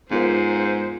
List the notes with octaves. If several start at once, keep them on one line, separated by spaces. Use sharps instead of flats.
G#2 B3 F4 A#4 C5